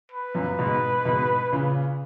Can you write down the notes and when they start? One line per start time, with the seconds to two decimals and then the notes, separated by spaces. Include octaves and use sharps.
0.12 B4
0.35 F#2 A#2
0.59 G#2 B2
1.05 G#2 B2
1.53 A#2 C#3